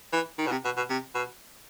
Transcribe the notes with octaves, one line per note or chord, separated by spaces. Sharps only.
E3
D#3
B2
C3
B2
B2
C3
B2